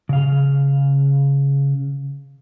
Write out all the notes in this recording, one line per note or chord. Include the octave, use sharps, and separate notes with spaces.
C#3 F5